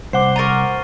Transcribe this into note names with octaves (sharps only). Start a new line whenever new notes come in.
C2 C5 F#5 D6 C7 G7
A#4 A#5 C#6 A6 D#7